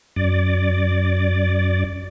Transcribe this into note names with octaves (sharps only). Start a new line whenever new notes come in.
F#2 D5